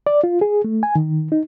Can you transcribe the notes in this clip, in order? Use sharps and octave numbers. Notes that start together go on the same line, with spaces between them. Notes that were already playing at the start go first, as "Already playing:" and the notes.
D5
F4
G#4
A3
G#5
D#3
D#4